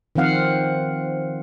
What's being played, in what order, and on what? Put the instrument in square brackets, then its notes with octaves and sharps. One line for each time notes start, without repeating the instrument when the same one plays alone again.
[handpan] D#3 F3 C4 F5 F#5